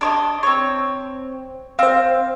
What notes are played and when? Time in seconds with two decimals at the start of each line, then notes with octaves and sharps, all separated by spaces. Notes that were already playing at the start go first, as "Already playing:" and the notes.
0.01 D4 C#5 D#5
0.43 C4 C#5
1.79 C4 C5 F5